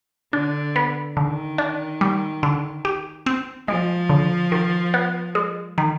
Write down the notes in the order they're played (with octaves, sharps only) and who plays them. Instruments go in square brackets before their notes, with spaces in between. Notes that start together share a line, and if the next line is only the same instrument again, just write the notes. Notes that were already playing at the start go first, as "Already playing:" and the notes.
[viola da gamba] D3 [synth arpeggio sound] D4
[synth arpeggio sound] B3
[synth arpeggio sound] D3 [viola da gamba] D#3
[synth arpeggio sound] D4
G3
D3
G4
C4
[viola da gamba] F3 [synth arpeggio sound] G#3
[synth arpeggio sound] D3
D#3
B3
G#3
D#3